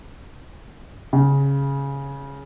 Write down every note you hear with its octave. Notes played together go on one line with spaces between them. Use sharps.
C#3